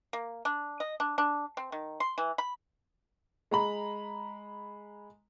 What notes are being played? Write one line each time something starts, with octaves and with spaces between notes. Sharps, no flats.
A#3
D4
D#5
D4
D4
C4
D#3
C6
E3
B5
G#3 A#5 B5